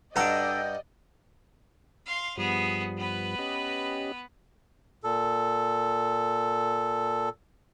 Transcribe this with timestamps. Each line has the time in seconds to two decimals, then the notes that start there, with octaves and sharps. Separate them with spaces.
0.16 G2 D4 F#4 A4 D5 D#5 G5 A#5
2.06 F5 C6
2.38 G2 F3 G3 B3 G#4
2.97 B3 B4
3.39 C#4 G4 D#5
5.04 A#2 A4